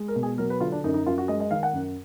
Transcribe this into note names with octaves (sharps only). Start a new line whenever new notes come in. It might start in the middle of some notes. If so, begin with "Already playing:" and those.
Already playing: G#3
A#4
B2
G#4
F#3 A#4
B4
D3 F4
D4
F#2 D#4
D#4
F#2 F4
F#4
G#3 D#5
D#5
D#3 F5
F#5
F#2